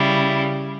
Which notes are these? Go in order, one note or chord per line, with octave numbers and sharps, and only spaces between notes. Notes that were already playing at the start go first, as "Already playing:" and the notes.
Already playing: C#3 G3 E4